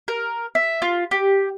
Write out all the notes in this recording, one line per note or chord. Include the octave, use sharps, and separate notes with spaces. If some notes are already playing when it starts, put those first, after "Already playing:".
A#4
E5
F4
G4